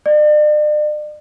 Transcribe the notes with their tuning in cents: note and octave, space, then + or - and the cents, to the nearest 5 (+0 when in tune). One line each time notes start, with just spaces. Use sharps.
D5 +40